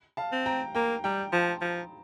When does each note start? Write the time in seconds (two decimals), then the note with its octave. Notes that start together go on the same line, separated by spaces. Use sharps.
0.17 F5 A5
0.32 C4
0.46 G5 A#5
0.75 A#3 G5 A#5
1.04 G3 G5 A#5
1.32 F3 A5 C6
1.61 F3